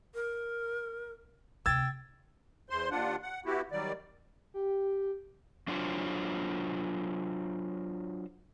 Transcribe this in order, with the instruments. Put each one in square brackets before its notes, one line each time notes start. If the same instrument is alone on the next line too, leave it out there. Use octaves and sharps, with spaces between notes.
[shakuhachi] A#4
[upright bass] D2 C3 [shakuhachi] G5 [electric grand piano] E6 G#6 A6
[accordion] E2 C5 C6
D#2 D4 F4 F#5
F#5
B3 E4 F#4 G4
D#3 F#3 G3 D5
[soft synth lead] G4
[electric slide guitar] F#3 D4 F4 F#4 C5 C#5